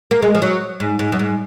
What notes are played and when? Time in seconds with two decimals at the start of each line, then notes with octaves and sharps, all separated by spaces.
0.11 A#3
0.22 G#3
0.35 F3
0.42 F#3
0.80 G#2
0.99 G#2
1.12 F#2
1.19 G#2